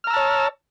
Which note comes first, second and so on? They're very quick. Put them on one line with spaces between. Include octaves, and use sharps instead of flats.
F6 A#5 E6 A5 C#5